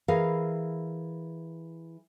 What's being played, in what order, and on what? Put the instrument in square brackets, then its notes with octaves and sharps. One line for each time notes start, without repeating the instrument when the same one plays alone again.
[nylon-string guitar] E3 G#4 A#4 F5